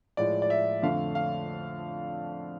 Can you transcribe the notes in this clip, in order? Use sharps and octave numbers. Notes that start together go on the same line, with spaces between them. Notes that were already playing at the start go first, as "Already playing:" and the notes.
A2 F3 G#3 D5
D5
E5
F2 D3 A3 F5
F5